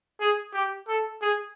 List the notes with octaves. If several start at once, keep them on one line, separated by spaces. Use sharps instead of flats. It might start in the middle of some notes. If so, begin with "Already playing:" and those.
G#4
G4
A4
G#4